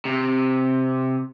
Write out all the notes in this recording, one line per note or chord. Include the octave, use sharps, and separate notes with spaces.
C3